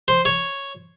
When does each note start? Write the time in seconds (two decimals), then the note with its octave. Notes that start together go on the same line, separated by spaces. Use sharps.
0.08 C5
0.25 C#5